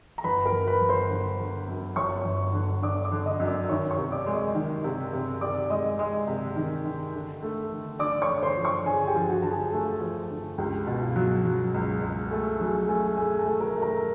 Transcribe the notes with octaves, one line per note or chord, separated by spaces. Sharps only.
A#5
G1 B4 B5
A#4 A#5
G1
B4 B5
G1
C5 C6
D3
D3
F#2
G1 C#5 C#6
G1
D3
D3 D5 D6
D5 D6
D3
D#5 D#6
F#2
D5 D6
D#3 C#5 C#6
C#5 C#6
C3
D5 D6
G#3
D#5 D#6
D#3
C3
C3
C3 D5 D6
G#3 D#5 D#6
G#3 D#5 D#6
C3
D#3
D#3
D3
A3
D3
D3 D5 D6
C#5 C#6
D3
C5 C6
F3
C#5 C#6
D3 G#4 G#5
G4 G5
F3
F#4 F#5
D3 A5
G#4 G#5
A3
F3
D3
C#2 G4 G5
B2
F4 F5
F#3
F#3
C#2
C#2
A3 G#4 G#5
F#3 G#4 G#5
A3 G#4 G#5
A3 G#4 G#5
A4 A5
A3
A#4 A#5
A3
A#4 A#5